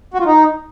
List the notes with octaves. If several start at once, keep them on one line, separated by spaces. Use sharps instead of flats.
F#4
F4
D#4